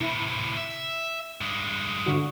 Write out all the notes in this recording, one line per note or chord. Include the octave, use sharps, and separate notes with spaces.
A2 C3 E4
E5
G2 G#3
D3 F#4